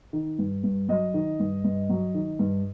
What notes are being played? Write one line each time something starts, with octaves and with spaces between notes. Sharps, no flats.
D#3
G2
G2
F#3 D#5
D#3
G2
G2
F#3
D#3
G2